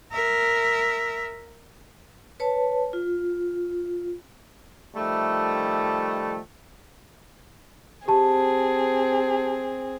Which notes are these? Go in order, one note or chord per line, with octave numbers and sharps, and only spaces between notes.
A#4 E5
B4 C#5 A5
F4
D#3 F3 G3 A3
C4 G4 G#4 A5